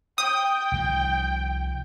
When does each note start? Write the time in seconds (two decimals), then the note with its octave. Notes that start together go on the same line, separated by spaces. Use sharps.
0.18 G5 D#6
0.72 C2 D#3 F3